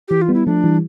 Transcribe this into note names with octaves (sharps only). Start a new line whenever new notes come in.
E3 G4
F4
G3 B3
E4
F3 A3 D4
E3 G3